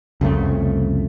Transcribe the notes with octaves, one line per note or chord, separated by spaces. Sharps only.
C2 F2 C#3 A3